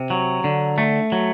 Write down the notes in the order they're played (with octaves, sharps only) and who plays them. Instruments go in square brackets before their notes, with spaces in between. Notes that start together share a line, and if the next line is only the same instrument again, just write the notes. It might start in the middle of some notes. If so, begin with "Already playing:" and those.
Already playing: [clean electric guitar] C3
F#3
D3
A3
F#3